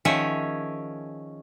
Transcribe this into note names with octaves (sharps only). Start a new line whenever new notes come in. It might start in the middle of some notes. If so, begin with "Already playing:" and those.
D#3 F3 C#4 G#4 C#5 E5